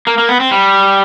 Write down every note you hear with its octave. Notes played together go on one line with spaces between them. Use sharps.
A#3
A#3
B3
C4
G3